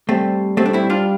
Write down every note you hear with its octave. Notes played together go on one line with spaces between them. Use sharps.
G3 A3 C4
G3 A3 C4
D4
C4 E4
D4 F4